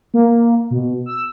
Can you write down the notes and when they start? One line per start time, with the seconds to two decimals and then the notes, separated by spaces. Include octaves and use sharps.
0.14 A#3
0.71 B2
1.06 E6